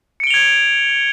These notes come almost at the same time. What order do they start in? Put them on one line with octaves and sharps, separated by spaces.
C#7 D7 G7 F7 G#6